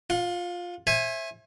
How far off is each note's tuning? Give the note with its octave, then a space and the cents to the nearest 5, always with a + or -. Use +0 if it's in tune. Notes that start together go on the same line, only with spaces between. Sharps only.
F4 +10 F#5 -35
C5 +45 E5 +0 G#5 +0